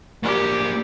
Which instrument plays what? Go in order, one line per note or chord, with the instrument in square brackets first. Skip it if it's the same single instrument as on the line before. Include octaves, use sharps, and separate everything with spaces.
[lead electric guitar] A#3 D4 [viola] G4